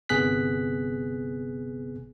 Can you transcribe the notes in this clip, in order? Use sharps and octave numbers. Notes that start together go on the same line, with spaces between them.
G1 C3 B3 G#4 F#6 B6